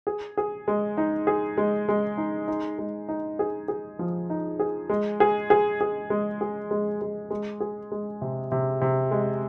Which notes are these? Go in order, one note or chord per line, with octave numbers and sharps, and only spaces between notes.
G#4
G#4
G#3
D#4
G#4
G#3
G#3
D#4
D#4
G#3
D#4
G#4
G#4
F3
D#4
G#4
G#3
G#4
G#4
G#4
G#3
G#4
G#3
G#3
G#3
G#4
G#3
C3
C3
C3
G#3